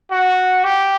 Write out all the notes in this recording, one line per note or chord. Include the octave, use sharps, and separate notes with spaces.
F#4
G4